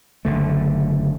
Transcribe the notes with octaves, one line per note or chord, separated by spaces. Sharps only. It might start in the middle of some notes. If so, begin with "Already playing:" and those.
F#1 D3 A3